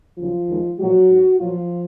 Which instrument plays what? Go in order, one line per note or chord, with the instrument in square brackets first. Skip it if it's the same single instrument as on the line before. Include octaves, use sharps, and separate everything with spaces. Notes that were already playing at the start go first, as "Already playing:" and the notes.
[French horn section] D#2 C#3 F3 F#3 F4
D#2 D#3 G#3
A#2 F3 F#3 G#3 F#4
G#2 F#3
A#2 F3 F#3 F4